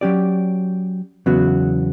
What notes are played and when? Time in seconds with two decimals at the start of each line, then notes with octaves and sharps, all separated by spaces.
0.01 F#3 C#4 G4 D5
1.26 E2 C#3 F#3 B3 F#4